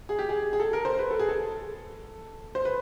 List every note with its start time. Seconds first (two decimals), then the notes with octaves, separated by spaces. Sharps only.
0.09 G#4
0.19 G4
0.29 G#4
0.53 G#4
0.60 A4
0.73 A#4
0.85 C5
0.99 B4
1.11 A4
1.19 G#4
1.29 A4
2.55 C5
2.65 B4